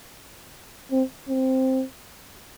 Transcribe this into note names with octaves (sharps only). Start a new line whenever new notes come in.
C4
C4